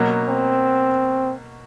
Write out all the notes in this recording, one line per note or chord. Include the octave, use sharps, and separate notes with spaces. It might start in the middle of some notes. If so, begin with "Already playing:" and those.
Already playing: B2 F#3 A#3
C4